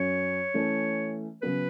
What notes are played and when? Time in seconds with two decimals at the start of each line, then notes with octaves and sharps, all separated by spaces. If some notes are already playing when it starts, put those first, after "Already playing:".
Already playing: F#2 F#3 C#4 C#5
0.54 E3 A3 C#4 A4
1.42 C#3 F#3 B3 B4